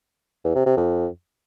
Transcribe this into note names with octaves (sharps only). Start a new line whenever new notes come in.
E2
C3
C3
F2